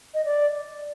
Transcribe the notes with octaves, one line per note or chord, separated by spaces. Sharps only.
D#5
D5